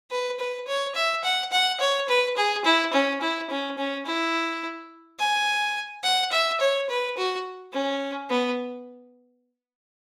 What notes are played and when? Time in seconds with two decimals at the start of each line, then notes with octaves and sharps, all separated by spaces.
0.11 B4
0.39 B4
0.67 C#5
0.95 E5
1.24 F#5
1.52 F#5
1.80 C#5
2.08 B4
2.37 G#4
2.65 E4
2.93 C#4
3.21 E4
3.50 C#4
3.78 C#4
4.06 E4
5.19 G#5
6.04 F#5
6.32 E5
6.60 C#5
6.89 B4
7.17 F#4
7.73 C#4
8.30 B3